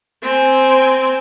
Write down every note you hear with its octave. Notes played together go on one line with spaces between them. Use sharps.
C4 G#5